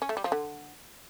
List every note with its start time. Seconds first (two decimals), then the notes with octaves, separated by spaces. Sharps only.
0.02 C#4
0.09 A3
0.17 G3
0.24 F3
0.32 D3